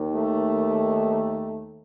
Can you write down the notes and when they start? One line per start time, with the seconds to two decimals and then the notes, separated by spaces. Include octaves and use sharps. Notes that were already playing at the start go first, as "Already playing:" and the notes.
Already playing: D#2 D#3
0.14 A3